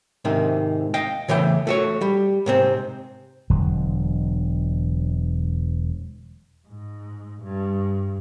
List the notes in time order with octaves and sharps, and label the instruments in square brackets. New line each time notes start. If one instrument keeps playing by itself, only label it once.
[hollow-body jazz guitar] G#2 C3 D#3
D#5 F5 G5
C#3 E3 A3 G5
A3 F#4 C#5
G3
G#2 C3 C4
[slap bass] E1 D3 F#3 G#3
[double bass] G#2
G2